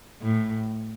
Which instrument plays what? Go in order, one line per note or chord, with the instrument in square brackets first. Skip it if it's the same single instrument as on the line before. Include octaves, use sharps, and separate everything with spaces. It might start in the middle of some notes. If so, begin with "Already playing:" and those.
[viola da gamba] A2